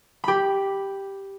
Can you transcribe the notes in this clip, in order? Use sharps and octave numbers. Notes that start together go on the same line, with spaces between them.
G4 B5